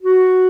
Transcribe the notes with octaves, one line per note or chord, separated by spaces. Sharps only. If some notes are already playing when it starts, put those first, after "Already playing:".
F#4